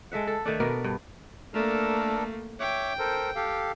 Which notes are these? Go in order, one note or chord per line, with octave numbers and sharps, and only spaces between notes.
G#3 A4 E5 F#5
A4
D#3 A3 D4
B2 B3 A#4 D5
G2
A3 A#3 D4 A4 A#4
C#5 E5 G5 D6
A4 A#4 C5
G4 A4 F5